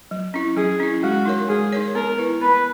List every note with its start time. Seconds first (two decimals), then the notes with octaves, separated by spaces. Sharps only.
0.11 F#3
0.34 C#4 E4
0.56 F#3 G#4
0.80 C#4 E4
1.03 G#3 F#4
1.25 D#4 A#4 C#5
1.49 G#3 G#4
1.72 D#4 A#4 C#5
1.95 B3 A#4
2.18 E4 B4
2.41 B3 B4